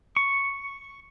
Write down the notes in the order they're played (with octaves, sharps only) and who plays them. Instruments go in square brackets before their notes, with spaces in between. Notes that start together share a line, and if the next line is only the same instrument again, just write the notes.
[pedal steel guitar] C#6